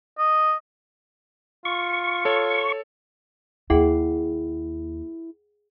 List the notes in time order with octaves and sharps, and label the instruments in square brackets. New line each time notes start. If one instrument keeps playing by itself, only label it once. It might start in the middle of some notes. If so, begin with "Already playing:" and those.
[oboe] D#5
[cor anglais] F4 [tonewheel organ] C#6
[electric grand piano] A4 C#5
[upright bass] D#2 [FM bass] E4 [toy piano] G#4 F#5 G5